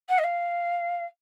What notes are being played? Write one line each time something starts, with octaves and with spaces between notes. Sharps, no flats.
F#5
D#5
F5